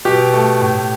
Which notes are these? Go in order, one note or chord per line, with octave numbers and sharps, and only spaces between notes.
B2 G4
A3
A2